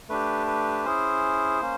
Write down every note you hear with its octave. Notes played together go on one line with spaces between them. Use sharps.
A3 D4 G4 B4
B4
C#4 E4 G#4 C5
A#3 C#4